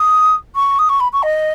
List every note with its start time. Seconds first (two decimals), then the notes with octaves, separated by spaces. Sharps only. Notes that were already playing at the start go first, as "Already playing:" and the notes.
Already playing: D#6
0.55 C#6
0.79 D#6
0.89 C#6
1.00 B5
1.12 C#6
1.23 D#5